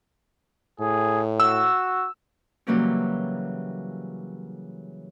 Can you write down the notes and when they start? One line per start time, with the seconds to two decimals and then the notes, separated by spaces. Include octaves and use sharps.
0.80 A2 G#4
1.40 F#4 E6
2.67 C#3 E3 F#3 G3 A#3 C#4